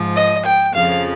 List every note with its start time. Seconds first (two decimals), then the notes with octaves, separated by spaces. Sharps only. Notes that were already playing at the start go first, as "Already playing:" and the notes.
Already playing: G#2 F3
0.16 D#5
0.45 G5
0.74 F2 C#3 F3 F5